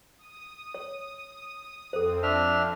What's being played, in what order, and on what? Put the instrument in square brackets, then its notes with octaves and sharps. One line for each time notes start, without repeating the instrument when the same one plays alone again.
[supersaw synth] D#6
[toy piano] C#5
[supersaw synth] F2 C4 [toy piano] A4 C5
[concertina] D4 E5 F6